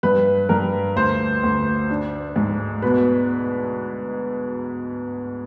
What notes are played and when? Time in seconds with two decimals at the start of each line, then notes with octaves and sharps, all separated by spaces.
0.03 G2 B4
0.49 G2 A#4
0.96 D2 C5
1.43 D2
1.90 D4
2.36 G#2
2.82 B2 B4